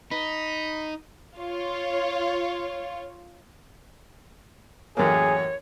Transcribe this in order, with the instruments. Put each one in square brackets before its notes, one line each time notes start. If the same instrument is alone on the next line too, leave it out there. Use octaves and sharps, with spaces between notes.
[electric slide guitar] D#4 [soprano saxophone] B5
[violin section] F4 C#5
[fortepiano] A1 F#2 A#3 [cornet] G#4 [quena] C#5